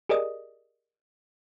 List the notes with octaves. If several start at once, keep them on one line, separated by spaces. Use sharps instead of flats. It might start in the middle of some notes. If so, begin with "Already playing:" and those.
G4 G#4 A#4 D5 D#5 D#6